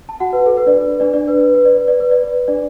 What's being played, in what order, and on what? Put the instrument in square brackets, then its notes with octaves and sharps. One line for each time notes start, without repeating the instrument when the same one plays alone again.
[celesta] A5
F#4 F#5
B4
A4
B4
D4 D5
B4
B4
D4 D5
D4 D5
B4
B4
B4
D5
B4
D5
B4
D5
B4
D4 D5